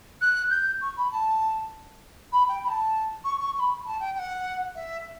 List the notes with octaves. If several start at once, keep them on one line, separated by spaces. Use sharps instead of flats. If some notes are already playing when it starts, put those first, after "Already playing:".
F#6
G6
C#6
B5
A5
B5
G5
B5
A5
C#6
C#6
C#6
B5
A5
G5
G5
F#5
E5